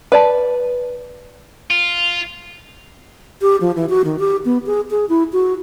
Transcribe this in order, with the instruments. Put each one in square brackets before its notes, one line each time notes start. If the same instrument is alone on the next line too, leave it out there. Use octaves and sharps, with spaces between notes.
[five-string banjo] B4 D5 A5
[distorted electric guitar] F4
[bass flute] G4
F3
E3
F#4
D#3
G4
B3
G#4
G#4
E4
F#4